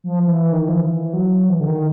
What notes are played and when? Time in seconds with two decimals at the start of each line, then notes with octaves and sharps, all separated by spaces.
0.04 F3
0.23 F3
0.27 E3
0.53 D#3
0.69 F3
0.77 E3
1.13 F#3
1.49 E3
1.60 D3
1.67 D#3